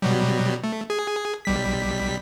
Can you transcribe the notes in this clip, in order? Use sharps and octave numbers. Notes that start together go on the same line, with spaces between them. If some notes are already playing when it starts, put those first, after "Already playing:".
B2 F#3 G3
A3
G#4
B1 G3 B6